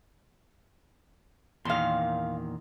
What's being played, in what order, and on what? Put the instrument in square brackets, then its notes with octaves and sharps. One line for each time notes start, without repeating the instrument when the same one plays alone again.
[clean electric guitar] E2 A#2 D#3 [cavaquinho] F5 C6